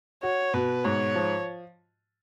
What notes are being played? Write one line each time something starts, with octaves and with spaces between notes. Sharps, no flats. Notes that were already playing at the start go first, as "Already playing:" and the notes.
F#4 C#5
B2 B4
G#2 C#5
F3